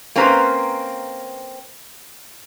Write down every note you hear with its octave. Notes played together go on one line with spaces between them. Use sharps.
A#3 C4 C#4 B4 C5 A#5